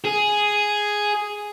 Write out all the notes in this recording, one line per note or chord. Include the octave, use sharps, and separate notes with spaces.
G#4